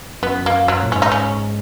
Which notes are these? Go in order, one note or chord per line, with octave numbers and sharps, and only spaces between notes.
F#2 B3
F#2 A#3
F#2 F#3
A#2
G#2 C#4
D#4
C#4